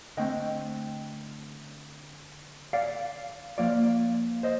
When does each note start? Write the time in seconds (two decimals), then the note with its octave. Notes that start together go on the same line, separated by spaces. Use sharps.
0.17 D3 A3 C4 D#5 G5
2.73 D5 F5
3.58 F3 A#3 F4 D5 F5
4.43 C5 D#5